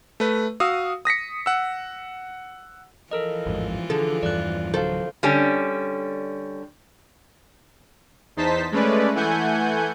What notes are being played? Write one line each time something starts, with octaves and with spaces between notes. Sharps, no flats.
A3 B4
F#4 F5 D#6 E6
D#6 A#6 B6 C#7
F#5 E6
E3 F3 F4 A4 A#4 D#5
A1 F2 G#2
D3 G#4 A4
E2 G2 D5 F#6
D1 D3 F#3 A4 C5 F5
D3 G3 C#4
E2 D#4 C5 A5 B6
G#3 A3 C#4 B4 D5
E3 A3 F#5 G#5 G6